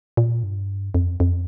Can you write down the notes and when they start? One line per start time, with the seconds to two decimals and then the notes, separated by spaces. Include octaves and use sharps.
0.17 A#2
0.43 G2
0.95 F2
1.20 F2